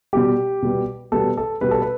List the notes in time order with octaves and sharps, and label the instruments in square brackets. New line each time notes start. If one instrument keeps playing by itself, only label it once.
[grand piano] B2 G3 B3 G4
B2 G3 B3
B2 G3 B3 A4
A4
B2 G3 B3 B4
A4
B4